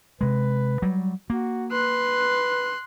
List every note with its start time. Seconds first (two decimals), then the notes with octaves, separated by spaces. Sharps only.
0.21 C3 G#3 B4
0.82 F#3 G3
1.30 A#3 F#4
1.72 B4 C6 F#6